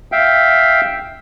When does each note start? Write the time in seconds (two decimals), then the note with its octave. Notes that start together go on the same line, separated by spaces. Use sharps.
0.12 E5 F5 G5